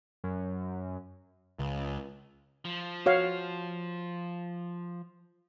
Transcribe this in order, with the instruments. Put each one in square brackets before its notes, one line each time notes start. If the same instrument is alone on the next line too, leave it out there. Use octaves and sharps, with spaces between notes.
[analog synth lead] F#2
[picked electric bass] C#2
[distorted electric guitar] F3
[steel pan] F#4 C#5 F5